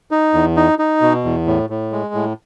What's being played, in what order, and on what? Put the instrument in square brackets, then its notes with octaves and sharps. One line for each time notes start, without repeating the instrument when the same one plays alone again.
[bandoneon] D#4
E2
D#4
D#4
B2
E2
A2
A2
G#3
A2